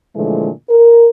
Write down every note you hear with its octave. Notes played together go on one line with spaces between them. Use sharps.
A#2 D3 E3 F3 G#3 A3
A#4